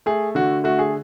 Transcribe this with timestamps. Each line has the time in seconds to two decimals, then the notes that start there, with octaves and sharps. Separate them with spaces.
0.06 A3 G#4
0.35 D3 F#4
0.64 A3 F#4
0.79 G#4